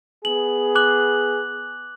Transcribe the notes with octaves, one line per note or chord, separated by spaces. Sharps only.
B3 G#4 F#7
D6 F#6 F#7